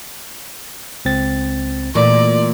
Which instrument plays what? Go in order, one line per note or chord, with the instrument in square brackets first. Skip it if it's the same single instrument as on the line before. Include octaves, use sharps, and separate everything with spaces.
[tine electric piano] C#2 C4 A6
[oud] A#2 [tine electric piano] E3 A3 [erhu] D5